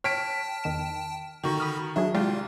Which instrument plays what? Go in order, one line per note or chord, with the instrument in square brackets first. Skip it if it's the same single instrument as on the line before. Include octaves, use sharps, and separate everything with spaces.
[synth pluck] C#5 [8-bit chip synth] G5 A5 [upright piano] F6 B6 D7
[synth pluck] E2 D#3 E7
[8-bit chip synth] D3 F#4 C#6 [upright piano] D#3
[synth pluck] B5 D#6 F6
[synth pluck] D#3 F#3 G#4 [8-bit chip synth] D4 [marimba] E5
[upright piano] C2 [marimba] G#3 F#4 [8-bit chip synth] F4 [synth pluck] D5 F5 G5